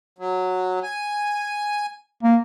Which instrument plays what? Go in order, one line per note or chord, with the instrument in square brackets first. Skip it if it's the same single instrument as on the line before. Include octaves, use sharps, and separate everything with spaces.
[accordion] F#3
G#5
[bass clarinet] A#3